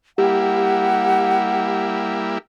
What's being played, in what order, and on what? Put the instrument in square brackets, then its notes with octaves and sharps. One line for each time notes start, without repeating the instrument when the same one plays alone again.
[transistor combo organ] G3 A#3 E4 [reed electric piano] G4 [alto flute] F#5